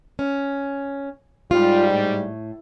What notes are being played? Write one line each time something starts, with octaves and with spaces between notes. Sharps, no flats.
C#4
G#2 G3 F4
A2